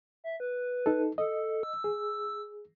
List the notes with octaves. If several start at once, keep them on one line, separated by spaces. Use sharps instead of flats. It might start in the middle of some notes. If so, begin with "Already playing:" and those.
E5
B4
D#4 A4
A4 D#5
E6
G#4